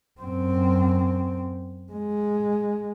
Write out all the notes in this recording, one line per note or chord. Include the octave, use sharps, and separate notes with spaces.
F#2 C4
G#3